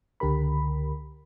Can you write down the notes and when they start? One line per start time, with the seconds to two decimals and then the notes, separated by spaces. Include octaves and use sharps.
0.20 C#2 D3 G4 A#4 B5